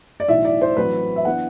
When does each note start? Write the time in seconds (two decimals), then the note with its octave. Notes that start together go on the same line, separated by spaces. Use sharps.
0.20 D5
0.28 B1 A2 E3 E5
0.45 D5
0.61 C5
0.77 A1 A2 F#3 C4 E4 B4
1.16 E5
1.25 E3 B3 D4 F#5